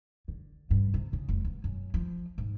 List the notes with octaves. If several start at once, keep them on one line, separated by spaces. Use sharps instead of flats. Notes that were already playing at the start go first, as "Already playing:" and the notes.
D3
G2
C3
C#3
F1
E2
F#2
F3
G#2